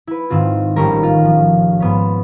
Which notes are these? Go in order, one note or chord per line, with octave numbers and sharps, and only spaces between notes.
E4 B4
G#2 D#3 C4 F4
A1 D#3 G3 A3 C#4 A#4
F4
F3
G#2 B3 C#4